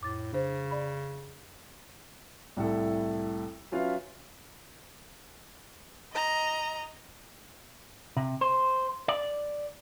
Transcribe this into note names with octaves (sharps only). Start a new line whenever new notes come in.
F2 A2 D6 A6
C#3 D4 C5
D5 B5
C2 A2 E4 A4
F#3 C#4 F4 B4 E5 F5
D#5 A#5
C3
C5
D5